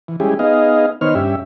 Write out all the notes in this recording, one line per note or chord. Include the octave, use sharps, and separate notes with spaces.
E3
G3 G#3 C#4 E4 G4 G#4
B3 D#4 G#4 D#5 F5
D#3 B3 D#4 C5 C#5 F6
G2 C#4 G4 E5